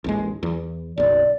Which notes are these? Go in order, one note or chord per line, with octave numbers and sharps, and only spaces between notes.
A1 D#2 G#3
E2
F#1 B1 D5